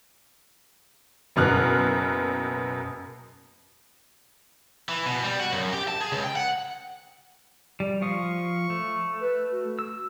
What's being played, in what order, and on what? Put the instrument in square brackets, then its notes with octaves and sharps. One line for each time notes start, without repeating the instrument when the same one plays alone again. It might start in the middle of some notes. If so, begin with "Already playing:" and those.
[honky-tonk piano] F#1 F#2 B2 F6 F#6
[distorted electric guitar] E3
B2
G3
F#4
F#2
G4
A5
G#4
C#2
G5
F#5
[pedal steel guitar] G3
[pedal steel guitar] F3 F5 D#6 [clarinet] C#6
[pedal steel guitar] A3
[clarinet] B4
F#4
[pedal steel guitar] E6